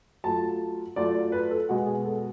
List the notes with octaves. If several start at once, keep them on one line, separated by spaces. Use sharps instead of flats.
F#3 A3 F4 A5
F#3 A3 F4 D5
D5
B4
A4
B2 G#3 B3 F#4
G#4
A4